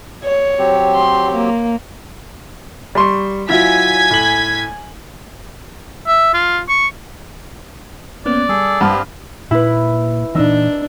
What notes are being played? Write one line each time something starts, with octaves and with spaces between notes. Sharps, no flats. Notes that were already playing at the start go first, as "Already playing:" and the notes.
C#5
F#3 C4 G4
C6
A#3
G3 C6 C#6
F#3 E4 F4 G#5 G#6 B6
A2 F#7
E5
F4
C#6
A#3 B3 C#4 D5
G3 G#4 A4
G2 C4 F#5 A5 F6
A#2 A#3 E4 B4
A#2 E3 D4 D#4 E6